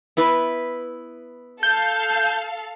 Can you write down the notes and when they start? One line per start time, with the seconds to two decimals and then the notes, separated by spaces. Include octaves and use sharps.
0.17 B3 E4 B4
1.63 A4 F5 G6